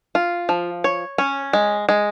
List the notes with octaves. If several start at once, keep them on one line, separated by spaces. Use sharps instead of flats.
F4
F3
C#5
C#4
G#3
G#3